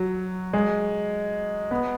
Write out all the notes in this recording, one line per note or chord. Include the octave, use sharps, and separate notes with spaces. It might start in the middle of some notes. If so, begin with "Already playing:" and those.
Already playing: F#3
G#3
B3